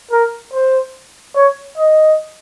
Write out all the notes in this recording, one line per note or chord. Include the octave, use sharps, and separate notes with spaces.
A#4
C5
C#5
D#5